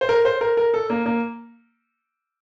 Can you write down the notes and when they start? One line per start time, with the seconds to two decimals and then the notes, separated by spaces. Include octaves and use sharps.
0.01 C5
0.09 A#4
0.25 C5
0.41 A#4
0.57 A#4
0.74 A4
0.90 A#3
1.06 A#3